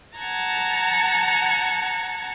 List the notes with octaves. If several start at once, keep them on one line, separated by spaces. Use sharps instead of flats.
F#5 A5 A#5 G#6 A6